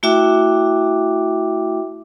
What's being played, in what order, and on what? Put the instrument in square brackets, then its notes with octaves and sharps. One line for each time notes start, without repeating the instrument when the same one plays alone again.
[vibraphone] A3 E4 F#4 E5 G5 D6